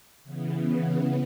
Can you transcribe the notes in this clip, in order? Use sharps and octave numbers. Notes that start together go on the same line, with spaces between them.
C#3 E3 B3